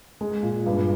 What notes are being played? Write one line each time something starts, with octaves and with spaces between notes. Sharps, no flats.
G#3
A#2
G2